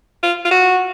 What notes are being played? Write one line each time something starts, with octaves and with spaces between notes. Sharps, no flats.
F4
F4
F#4